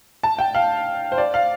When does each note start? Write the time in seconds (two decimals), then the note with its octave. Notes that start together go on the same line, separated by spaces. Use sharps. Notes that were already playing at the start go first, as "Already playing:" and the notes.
0.23 A5
0.39 G5
0.55 F5
1.12 C5
1.18 D5
1.34 F5